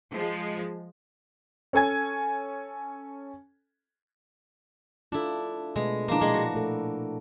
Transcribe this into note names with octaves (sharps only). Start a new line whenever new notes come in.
F3 G#3
C#4 A4 G#5 G#6
D4 E4 F4 A4
B2 G#3 A3 B4
F3 A#3 D4 E4
A#2 G#3
F#4
A3 A4 A#4